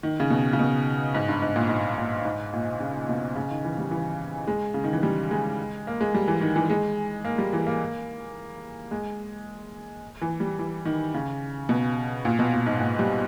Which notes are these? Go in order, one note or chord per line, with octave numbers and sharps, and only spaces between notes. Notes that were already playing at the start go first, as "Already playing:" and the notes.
D#3
C#3
B2
C#3
B2
G#2
G2
G#2
A#2
G#2
A#2
G#2
A#2
C#3
B2
C#3
D#3
E3
G3
E3
G#3
C#3
D#3
E3
G3
G#3
A#3
G#3
G3
E3
D#3
E3
G#3
A#3
G3
E3
A#3
G#3
E3
G3
E3
D#3
C#3
B2
A#2
B2
A#2
G#2
A#2
G3